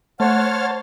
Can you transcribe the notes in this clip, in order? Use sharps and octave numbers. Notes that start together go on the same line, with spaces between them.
A3 C5 C#5 F#5 A5 F6